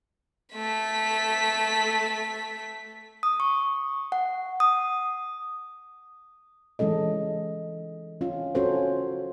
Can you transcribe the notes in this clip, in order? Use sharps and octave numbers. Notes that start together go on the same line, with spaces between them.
A3 B6
D#6
C#6
F#5
D#6
E3 G#3 C#4 A4 D#5
C#4 F4
C#4 F4 F#4 A4 C5 C#5